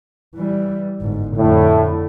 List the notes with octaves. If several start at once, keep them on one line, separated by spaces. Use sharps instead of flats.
E3 G3
G1 G#2
F2 A2 D3